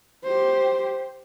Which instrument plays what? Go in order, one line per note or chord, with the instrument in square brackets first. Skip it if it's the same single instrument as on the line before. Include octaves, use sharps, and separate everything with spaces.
[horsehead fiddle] G4 C5